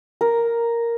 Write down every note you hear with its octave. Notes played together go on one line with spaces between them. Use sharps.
A#4